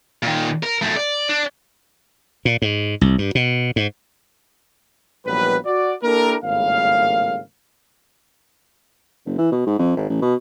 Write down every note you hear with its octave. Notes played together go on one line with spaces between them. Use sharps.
A#2 D#3
A#4
F#2 A3
D5
D4
A#2
G#2
C2
G2
B2
G#2
A#1 E3 F#3 G3 B3 B4
F#4 D5
A#3 D4 E4 G4 A4 A#4
G#1 A2 C#3 G3 A#3 F5
F#1
E3
B2
G#2
F2
G#1
A1
B2